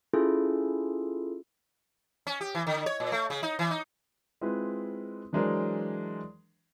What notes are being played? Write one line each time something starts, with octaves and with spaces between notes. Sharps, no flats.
C#4 E4 F4 G#4 A4
C#4
G4
E3
D3
C#5
A#2
A3
C#3
D#4
E3
D#4
G#3 C4 E4 F4 B4
E3 F#3 G#3 D4 A#4 C5